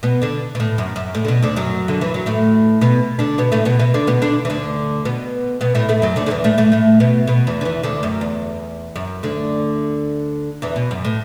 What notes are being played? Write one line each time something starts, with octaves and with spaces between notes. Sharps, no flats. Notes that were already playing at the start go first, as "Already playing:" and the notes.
B2 B3
D3 D4
B2
A2
F#2
F#2
A2
D3
B2
D2 D3
F#2 F#3
D3
E3
F#3
A2 A3
B2 B3
D3 D4
B2 B3
A2 A3
B2 B3
B2 B3
D3 D4
B2 B3
D3 D4
E3
D2 D3
B2 B3
B2 B3
A2 A3
A2 A3
F#2 F#3
D2 D3
D3
E2 E3
A2 A3
A2 A3
A2 A3
B2 B3
B2 B3
E2 E3
D3
E2 E3
D2 D3
F#2
E2
F#2
D2 D3
E2 E3
B2
F#2
A2